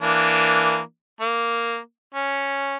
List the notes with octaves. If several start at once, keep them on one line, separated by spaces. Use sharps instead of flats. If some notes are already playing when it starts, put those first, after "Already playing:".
E3 A#3 D4
A#3
C#4